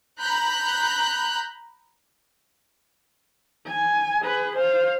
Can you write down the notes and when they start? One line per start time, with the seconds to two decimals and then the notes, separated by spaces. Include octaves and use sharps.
0.20 A#5 B5 F#6 G6
3.67 G#5
4.22 G#4 B4
4.56 C5 F5